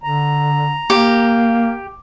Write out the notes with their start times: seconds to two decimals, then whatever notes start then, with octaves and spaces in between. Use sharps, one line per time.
0.04 D3 A#5
0.90 A#3 G4